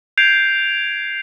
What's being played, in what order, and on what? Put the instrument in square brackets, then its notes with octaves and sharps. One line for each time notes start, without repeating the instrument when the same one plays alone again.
[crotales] G6 G#6 C7 D7 F7